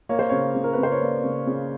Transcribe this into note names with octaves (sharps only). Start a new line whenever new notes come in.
A#3 C#5
C5
C#3 C#5
C#3
A#4
B4
C#3 C5
C#5
A#3 D5
C#3
C#3